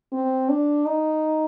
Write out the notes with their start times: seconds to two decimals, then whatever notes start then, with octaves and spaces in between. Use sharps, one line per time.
0.13 C4
0.49 D4
0.86 D#4